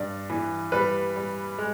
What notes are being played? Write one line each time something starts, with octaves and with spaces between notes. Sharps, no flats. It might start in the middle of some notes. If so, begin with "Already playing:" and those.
Already playing: G2 D5
E3
G3 B4
G3
G#3